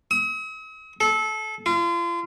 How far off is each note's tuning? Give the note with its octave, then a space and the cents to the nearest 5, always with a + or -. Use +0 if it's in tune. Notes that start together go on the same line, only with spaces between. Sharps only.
D#6 +45
A4 -25
F4 -35